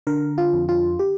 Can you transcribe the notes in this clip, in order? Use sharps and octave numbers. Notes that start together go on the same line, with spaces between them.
D3 A#4
F4
F2
F4
G4